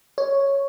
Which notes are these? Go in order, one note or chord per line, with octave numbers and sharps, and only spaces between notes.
C#5